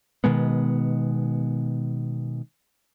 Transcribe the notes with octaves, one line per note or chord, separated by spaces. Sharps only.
B2 D#3 G#3 B3